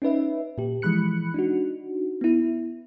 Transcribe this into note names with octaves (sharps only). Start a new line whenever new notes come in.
C#4 D#4 B4 E5
A#2 G4
E3 F3 G#3 B5 F#6 C#7
D4 D#4 F#4
B3 E4